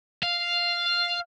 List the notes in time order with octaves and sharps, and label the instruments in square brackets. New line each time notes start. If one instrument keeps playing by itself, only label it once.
[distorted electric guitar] F5